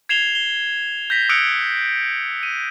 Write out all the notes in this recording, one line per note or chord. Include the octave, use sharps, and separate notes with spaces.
G#6 C7 E7 F7 G7
G7
G6 A#6 B6
D#6 E6 F#6 C#7 D7 F7
D#7